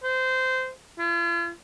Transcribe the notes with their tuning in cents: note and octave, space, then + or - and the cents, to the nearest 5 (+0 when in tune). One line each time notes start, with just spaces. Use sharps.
C5 -20
F4 -45